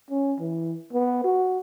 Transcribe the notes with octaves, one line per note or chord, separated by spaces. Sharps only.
C#4
E3
B3
F#4